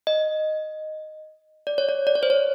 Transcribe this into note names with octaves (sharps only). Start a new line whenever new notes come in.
D#5
D5
C#5
D5
D5
C#5
C5
C#5